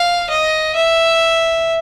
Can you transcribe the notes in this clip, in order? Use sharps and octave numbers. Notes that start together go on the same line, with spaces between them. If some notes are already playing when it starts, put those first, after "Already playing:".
Already playing: F5
D#5
E5